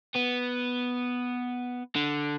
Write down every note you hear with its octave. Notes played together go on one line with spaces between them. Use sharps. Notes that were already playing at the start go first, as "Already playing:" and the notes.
B3
D3